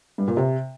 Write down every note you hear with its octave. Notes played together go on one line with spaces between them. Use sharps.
G2
A#2
C3